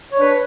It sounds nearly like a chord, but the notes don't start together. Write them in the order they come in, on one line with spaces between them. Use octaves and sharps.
C#5 D4 B4